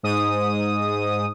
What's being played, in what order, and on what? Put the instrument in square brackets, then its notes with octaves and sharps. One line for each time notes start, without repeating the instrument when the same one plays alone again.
[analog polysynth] G#2 D#6